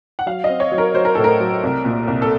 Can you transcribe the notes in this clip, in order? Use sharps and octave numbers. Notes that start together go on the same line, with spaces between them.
F#5
F#3 F5
C4 D#5
C#5
F#3
A#4
F#3 C5
A#4
A2 A4
A#4
F#3
C2
A#2
C2
A4